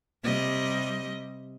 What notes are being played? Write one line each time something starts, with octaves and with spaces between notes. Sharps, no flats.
C3 G3 D#5